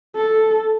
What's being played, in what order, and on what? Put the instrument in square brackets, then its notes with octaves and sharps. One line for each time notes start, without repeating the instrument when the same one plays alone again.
[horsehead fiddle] A4